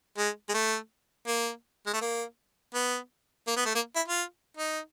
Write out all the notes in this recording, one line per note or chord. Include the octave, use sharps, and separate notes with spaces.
G#3
G#3
A3
A#3
G#3
A3
A#3
B3
A#3
B3
A3
A#3
E4
F4
D#4